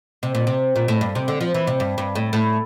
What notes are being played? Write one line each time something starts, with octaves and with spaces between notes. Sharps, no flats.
C3
A#2
C3
A#2
A2
G2
C3
D3
F3
E3
C3
G2
G2
A2
A2